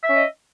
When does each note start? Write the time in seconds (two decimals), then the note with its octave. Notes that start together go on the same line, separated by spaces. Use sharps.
0.04 E5
0.09 C#4
0.13 D#5